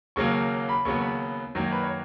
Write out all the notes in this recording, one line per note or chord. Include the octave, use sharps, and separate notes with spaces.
D#2 C#3 F#3 A#3 C#6
B5
D#2 C#3 F#3 B3 C#6
C#6
B5
F#2 D#3 F#3 A#3 C#5
B4
C#5